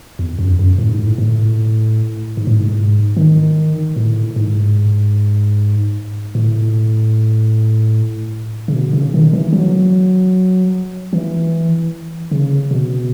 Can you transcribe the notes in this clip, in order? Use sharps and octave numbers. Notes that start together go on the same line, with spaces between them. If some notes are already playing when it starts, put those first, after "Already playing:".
E2
F#2
F#2
A2
G#2
A2
A2
G#2
A2
G#2
D#3
A2
G#2
A2
C#3
B2
C#3
D#3
E3
F#3
E3
C#3
B2